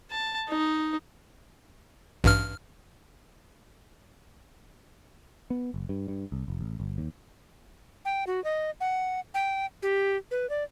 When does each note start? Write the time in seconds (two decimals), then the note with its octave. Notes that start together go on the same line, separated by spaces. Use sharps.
0.11 A5
0.49 D#4
2.24 A1 G2 F6
5.50 B3
5.74 F#1
5.89 G2
6.08 G2
6.32 C2
6.48 F1
6.61 A1
6.80 G1
6.98 D#2
8.05 G5
8.27 F#4
8.44 D#5
8.81 F#5
9.34 G5
9.82 G4
10.31 B4
10.50 D5